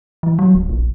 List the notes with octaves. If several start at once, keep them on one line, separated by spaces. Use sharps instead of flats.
E3
F#3
D1
A#1